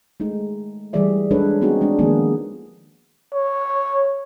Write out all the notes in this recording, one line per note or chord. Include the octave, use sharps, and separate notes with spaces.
G#3 A3 D#4
E3 G3 A3 G#4 D5 E5
G#3 D4 D#4 A4 B4 C#5
B3 C4 D#4 F#4 G#4
G#3 D4
D#3 F3 A#3 B3 D#4 G#4
C#5